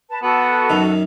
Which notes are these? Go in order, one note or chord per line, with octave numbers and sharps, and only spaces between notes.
B4 A5
B3 F#4 A4
F#2 D#3 D#4